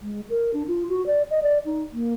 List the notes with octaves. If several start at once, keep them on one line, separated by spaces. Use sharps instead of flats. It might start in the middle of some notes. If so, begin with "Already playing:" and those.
G#3
A#4
D4
F4
F#4
D5
D#5
D5
D#4
A#3